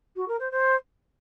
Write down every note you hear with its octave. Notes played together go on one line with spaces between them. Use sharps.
F#4
A#4
C5
C5